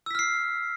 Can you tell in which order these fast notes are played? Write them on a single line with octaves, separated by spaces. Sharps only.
E6 B6 F6 C7